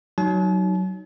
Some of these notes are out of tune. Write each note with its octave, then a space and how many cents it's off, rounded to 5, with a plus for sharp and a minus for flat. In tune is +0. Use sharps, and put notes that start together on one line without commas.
F#3 +15 D#4 -5 A5 -45